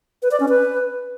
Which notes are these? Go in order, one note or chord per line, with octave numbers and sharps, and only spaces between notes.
B4
D5
C#4
B4